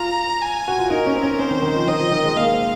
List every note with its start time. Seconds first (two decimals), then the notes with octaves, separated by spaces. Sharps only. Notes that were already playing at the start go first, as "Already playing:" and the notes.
Already playing: F4 A#5
0.41 G#5
0.68 F#4
0.78 F4
0.90 D#4 A#4
1.06 C#4
1.15 C4
1.23 C#4
1.39 C#4 C5
1.51 D#3
1.62 D#3
1.75 F3
1.87 D#3 D#5
1.99 F3
2.11 D#3
2.24 G#3
2.36 A#3 F5
2.53 C4